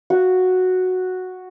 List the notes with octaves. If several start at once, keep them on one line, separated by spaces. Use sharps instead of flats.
F#4